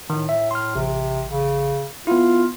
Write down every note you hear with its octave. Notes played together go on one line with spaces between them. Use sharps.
A2 D#3
E5
C6 F6
A1 C3
C#3
B3 E4 F4